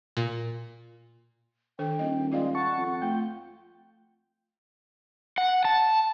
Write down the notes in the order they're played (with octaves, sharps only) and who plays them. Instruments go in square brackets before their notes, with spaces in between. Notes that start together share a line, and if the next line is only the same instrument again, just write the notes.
[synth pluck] A#2
[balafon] D#3 D4 A4 [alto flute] G5
[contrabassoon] D#1 [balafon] D#5
[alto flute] G#3 [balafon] F4 D5 F5
[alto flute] F#5 [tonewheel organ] A5 C#6
[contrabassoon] F2
[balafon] A3 [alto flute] F4 [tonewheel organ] G5
[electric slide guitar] F#5
A5